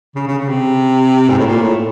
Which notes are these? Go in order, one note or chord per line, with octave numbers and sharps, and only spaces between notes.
C#3
C#3
C#3
C3
G#2
A2
A#2
A2